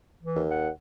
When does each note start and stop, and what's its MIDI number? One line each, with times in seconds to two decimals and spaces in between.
0.23 0.43 52
0.36 0.69 39
0.50 0.70 78